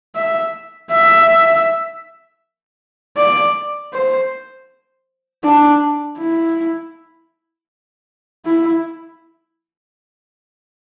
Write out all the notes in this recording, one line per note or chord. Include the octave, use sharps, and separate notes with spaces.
E5
E5
D5
C5
D4
E4
E4